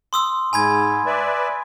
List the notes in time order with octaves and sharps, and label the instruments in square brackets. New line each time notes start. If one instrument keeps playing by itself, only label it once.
[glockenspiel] C6 D#6 E6
[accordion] G#2 [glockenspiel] G#5 B5 G#6
[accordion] B4 D5 E5